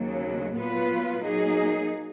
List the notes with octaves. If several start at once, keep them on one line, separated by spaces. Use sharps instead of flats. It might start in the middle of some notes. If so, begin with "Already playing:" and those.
Already playing: D#2 C#3 F#3
A#2 F#3 B3 F4 B4
F#3 A#3 D#4 G#4